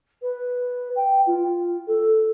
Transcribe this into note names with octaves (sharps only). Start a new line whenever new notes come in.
B4
G5
F4
A4